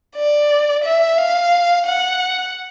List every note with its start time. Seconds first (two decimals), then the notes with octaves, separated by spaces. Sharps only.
0.16 D5
0.84 E5
1.18 F5
1.86 F#5